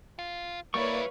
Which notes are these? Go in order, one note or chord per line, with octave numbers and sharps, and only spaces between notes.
F4
G3 A#3 E4 B4 C#5 D5 F5 C#6